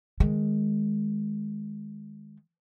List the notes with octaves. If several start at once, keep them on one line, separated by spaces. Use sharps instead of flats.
D#3 G#3